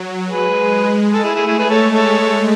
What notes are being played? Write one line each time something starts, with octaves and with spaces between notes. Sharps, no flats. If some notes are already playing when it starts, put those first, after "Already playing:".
Already playing: F#3
G#3 G#4 B4
A4
A3 E4 G#4
E4 G#4
E4 G#4
G#4 B4
G#3 A4 C#5
A4 C#5